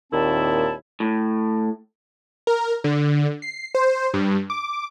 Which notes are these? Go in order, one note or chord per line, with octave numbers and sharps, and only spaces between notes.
D#2 A#2 D#3 C4 E4 A5
A2
A#4
D3
C7
C5
G2
D6